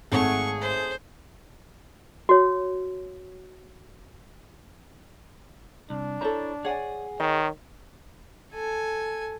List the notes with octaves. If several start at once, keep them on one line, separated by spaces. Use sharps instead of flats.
G#1 A3 G#4 C#5 F#5 C#6
C5
F#4 C#5
C2 D4
E4 A4 C5 C#5 A#5
G#4 C#5 D5 F#5 G#5
D#3 C#5 D#5
A4 G#5